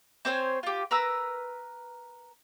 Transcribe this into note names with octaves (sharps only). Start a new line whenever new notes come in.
C4 C5 C#5 G#5
F4 G4
A#4 B4 A#5 E6